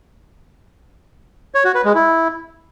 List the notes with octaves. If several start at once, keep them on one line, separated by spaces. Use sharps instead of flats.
C#5
F#4
B4
G#3
E4